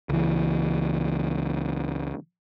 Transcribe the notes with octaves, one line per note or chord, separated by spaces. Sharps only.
C#2 E3